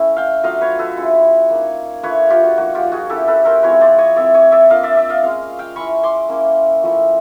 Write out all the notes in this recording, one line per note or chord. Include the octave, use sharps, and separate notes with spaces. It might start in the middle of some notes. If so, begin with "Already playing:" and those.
Already playing: A3 C#4 E4
F5 G5
F#3 A3 D4 F4 D#5 F5
B4 C#5
A4 B4
G#3 C#4 E4
A#3 D#4
A3 D4 F4 B4 C#5
F4 G4
F#4
F3 A#3 D#4 F#4
F4 G4
F#4 G#4
A3 C#4 E4 G4 A4
A4 B4
A#4 C5
F3 G#3 C4 E4 B4 C#5
C5 D5
C#5 D#5
A3 C4 E4 D5 E5
C#5 D#5
D5 E5
A#3 D4 F4 D#5 F5
D5 E5
D5 E5
D#5 F5
G#3 C#4 F4 D#5 F5
F5 G5
G#3 C#4 E4 B5 C#6
C6 D6
A#3 C#4 E4
F3 A3 C#4 E4